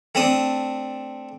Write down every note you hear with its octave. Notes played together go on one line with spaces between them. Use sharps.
A3 C4 D4 D#6